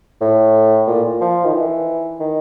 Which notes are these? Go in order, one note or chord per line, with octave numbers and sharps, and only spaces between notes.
A2
A#2
F3
D#3
E3
D#3